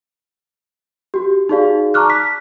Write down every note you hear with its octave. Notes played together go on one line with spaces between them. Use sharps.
F#4 G4
D#4 F#4 G#4 D5 F5
A5 A#5 C#6 D6 F6 F#6
B6